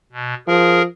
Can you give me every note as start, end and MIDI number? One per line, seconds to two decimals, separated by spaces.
0.12 0.34 47
0.47 0.85 53
0.47 0.82 68
0.47 0.82 70